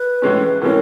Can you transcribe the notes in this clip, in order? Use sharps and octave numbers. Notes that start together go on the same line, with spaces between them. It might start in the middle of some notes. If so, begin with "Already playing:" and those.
Already playing: B4
A2 E3 G#3 C#4
A2 E3 G#3 C#4 A#4